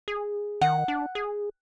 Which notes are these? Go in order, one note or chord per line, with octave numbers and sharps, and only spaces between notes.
G#4
D#3 F#5
D4
G#4